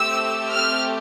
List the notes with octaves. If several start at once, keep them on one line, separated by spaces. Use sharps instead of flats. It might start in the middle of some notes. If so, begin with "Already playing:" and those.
Already playing: A3 C4 G4 E6
F6